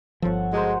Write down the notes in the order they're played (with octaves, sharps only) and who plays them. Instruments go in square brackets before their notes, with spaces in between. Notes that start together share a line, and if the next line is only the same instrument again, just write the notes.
[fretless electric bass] G1 F3 [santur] A4 C#5 F#5
[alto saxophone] G#3 [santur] F#4 A#4 C5